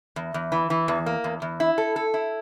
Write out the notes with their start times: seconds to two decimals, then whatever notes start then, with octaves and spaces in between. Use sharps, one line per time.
0.16 E2
0.34 E2
0.52 E3
0.70 E3
0.88 E2
1.06 A#3
1.24 E2
1.42 E2
1.60 E4
1.78 A4
1.96 A4
2.14 E4